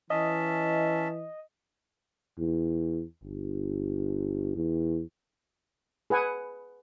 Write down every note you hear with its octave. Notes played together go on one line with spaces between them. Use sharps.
E3 C#4 D#5 E5 A5
E2
G1
E2
G#4 B4 F#5 G#5